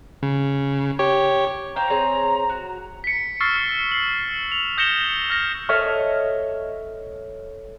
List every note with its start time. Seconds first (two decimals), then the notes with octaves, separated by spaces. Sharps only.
0.23 C#3
0.99 G4 C#5
1.76 G4 C5 F5 A#5
1.90 C4 G#4 C#5
2.49 F#4
3.04 B6 C#7
3.40 C#6 E6 F6 A6 C7
3.92 C7 F#7
4.52 F7
4.77 D#6 G6 A#6 C#7 E7 G7
5.30 F6 A#6
5.69 A4 C#5 D#5 E5 C#6 F6